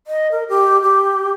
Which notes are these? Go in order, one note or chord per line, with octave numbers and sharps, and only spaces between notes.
D#5
A#4
G4
G4